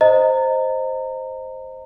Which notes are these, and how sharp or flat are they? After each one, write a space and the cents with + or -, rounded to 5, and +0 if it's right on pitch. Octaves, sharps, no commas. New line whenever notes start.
C5 +0 D#5 +0 A#5 -30